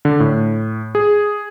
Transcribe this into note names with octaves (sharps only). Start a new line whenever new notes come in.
D3
A2
G#4